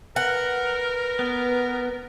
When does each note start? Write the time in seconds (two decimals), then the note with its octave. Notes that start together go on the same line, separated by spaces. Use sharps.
0.16 A#4 B4 F#5
1.19 B3